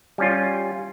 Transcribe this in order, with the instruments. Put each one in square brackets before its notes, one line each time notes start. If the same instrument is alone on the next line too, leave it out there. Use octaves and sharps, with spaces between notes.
[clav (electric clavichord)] G3 C#4 F4